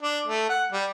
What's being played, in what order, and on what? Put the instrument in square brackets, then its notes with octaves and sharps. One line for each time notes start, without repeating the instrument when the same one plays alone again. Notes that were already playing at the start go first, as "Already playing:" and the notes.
[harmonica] D4
A3
F#5
G3